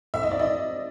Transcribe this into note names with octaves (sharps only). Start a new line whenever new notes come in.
E5
D#5
D5
D#5